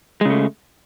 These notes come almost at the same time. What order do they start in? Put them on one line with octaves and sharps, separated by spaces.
G#3 C#3 A3